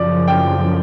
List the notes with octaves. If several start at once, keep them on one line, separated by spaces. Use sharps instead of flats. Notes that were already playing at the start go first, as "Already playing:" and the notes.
Already playing: F#2 C#3 F3 D5
G5